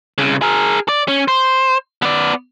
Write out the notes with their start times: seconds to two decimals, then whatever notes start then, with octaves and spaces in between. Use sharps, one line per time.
0.18 C2 C#3
0.42 G#4 A#4
0.89 D5
1.08 C#4
1.28 C5
2.02 B3 D5